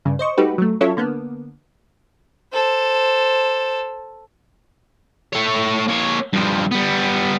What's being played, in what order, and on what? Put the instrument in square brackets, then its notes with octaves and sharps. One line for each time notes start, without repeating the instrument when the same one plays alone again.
[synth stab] G2 C#3
C5 D#5 C#6
G3 A3 D#4 F#4 G4 B4
F#3 A3
F#3 C#4 E4 F4 A4 C#5
D3 A#3 B3
[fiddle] A4 C5
[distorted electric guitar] A3 C#5
A#3 C#5
G2 F3
G3 B3